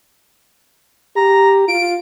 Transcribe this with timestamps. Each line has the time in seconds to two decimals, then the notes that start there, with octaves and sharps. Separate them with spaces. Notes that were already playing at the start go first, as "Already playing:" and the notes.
1.16 G4 A#5
1.68 F4 D7